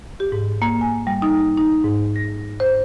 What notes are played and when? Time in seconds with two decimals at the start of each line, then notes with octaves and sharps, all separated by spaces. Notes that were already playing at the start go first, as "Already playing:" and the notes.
0.20 G4
0.32 G#2
0.62 A#3
0.81 G#5
1.07 G3
1.22 D#4
1.58 D#4
1.84 G#2
2.16 A#6
2.60 C5